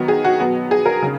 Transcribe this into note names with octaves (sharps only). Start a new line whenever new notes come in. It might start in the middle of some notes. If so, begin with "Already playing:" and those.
Already playing: D#3 F#3 B3
G#4
F#4
B2 F#3 B3
G#4
A#4
C#3